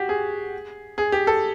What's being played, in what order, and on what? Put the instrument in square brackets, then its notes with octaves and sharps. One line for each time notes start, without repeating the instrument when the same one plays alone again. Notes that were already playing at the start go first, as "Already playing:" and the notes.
Already playing: [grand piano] F#4 G4
G#4
G#4
G4
A4